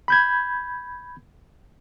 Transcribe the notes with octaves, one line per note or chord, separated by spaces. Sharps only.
B5 G6 G#6